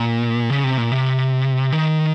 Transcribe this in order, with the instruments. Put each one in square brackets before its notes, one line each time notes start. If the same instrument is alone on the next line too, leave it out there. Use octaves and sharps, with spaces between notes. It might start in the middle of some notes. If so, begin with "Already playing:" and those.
Already playing: [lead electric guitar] A#2
C#3
C3
A#2
C3
D#3